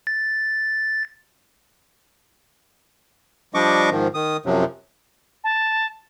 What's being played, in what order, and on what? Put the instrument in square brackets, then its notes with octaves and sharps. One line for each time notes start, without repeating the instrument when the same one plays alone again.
[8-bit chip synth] A6
[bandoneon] F3 G3 D4 D#5 C#6 D6
G#2 D#3 F3
D#3 D#6
F#2 C3 F3 F#3
[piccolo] A5